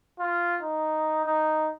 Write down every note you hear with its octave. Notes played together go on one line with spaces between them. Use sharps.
F4
D#4
D#4